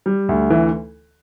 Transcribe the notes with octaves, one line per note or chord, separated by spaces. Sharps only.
G3
D2
E3